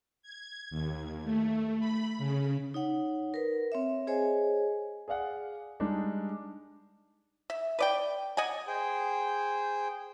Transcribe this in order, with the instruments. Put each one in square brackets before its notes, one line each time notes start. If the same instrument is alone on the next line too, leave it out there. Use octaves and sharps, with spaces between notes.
[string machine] G#6
D#2
A3
B5
C#3
[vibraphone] D#4 C#5 F#5
A#4 B4
C4 C#5 E5
G#4 C5 C#5 D#5 G#5
[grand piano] G#4 D5 F5 F#5
G3 G#3 D4 D#4
[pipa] E5
B4 D5 G5
D5 D#5 F#5 G#5
[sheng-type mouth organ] G#4 C5 G5